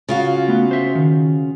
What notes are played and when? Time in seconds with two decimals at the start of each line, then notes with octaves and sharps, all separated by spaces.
0.08 C#3 F4 F#4
0.48 A3 B3
0.71 C5 E5
0.95 D#3